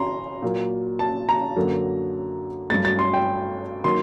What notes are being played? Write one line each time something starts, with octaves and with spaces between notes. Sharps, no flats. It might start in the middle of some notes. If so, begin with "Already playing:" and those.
Already playing: A#5 C6
A#2 F#3 A#3
A5
A#5
F#2 D3 F#3 A#3
G2 F#3 A3 A6
A6
C6
G5
D#3 F#3 A#3 C6